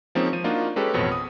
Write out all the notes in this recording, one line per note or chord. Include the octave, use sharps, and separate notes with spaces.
F3 G#3 A#3 C4 C#4 D#4
F3 D#7
A#3 D4 D#4 F4 F#4
G#3 C#4 G4 A4 B4
A1 F2 B2 C4 C#5
D#6